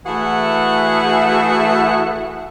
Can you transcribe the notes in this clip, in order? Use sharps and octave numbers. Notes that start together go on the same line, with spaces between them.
E3 A3 F#4 G#4 E5 F#5